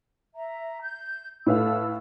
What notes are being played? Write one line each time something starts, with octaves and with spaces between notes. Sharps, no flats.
E5 A#5
G6
A2 A4 B4 F5 E6